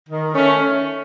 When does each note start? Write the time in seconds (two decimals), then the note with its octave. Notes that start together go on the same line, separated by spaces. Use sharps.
0.08 D#3
0.34 A3 C#4